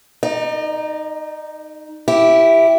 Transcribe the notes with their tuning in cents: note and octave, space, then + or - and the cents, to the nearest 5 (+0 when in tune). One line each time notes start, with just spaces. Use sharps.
D#4 +0 D5 +45
E4 +0 G4 +0